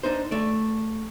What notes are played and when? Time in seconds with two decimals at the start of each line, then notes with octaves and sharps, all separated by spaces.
0.03 D4 D#4 C5
0.31 A3 D5